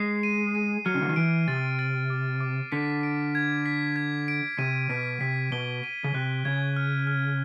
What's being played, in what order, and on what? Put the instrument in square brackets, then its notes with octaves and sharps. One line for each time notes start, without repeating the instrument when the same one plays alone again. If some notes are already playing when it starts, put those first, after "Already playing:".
Already playing: [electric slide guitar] G#3 [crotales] C7
[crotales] D#7
D#7
[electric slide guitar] F#3 [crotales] F6
[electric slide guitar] C#3
D3
D#3
[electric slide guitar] E3 [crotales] D7
[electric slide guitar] C3 [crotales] A6
[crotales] A6
D6
D6
[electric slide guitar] D3 [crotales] B6
[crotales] D7
G#6
B6
G#6
D7
[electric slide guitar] C3 [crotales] D#7
[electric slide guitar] B2 [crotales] B6
[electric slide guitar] C3 [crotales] B6
[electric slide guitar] B2 [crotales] G7
[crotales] D#7
[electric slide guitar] C#3
[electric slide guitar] C3 [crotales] F#6
[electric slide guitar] C#3 [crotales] G#6
[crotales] F6
F6